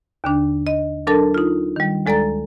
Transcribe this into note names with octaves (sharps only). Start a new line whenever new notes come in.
D#2 D3 D4
D#5
F#3 D4 A4 A#4 A5 A6
D#4 F4
D#3 G3
D2 G#3 A4 D5 A#5 A6